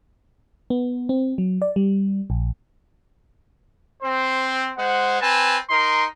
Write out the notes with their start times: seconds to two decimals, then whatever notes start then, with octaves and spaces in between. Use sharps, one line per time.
0.70 B3
1.09 C4
1.38 F#3
1.62 D5
1.76 G3
2.30 A#1
4.03 C4 C5
4.78 G#3 C5 F#5
5.21 C4 B4 G#5 A5
5.70 D#4 A#4 C6